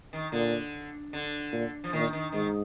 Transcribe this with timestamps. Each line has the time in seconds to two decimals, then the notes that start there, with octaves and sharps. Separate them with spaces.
0.13 D#3
0.32 A#2 D3
1.13 D3
1.52 A#2
1.84 F3
1.93 A#2 D#3
2.13 D#3
2.32 G#2 D#3